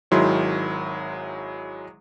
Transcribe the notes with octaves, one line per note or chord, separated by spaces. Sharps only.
G#1 D#3 F#3 G#3 E4 C6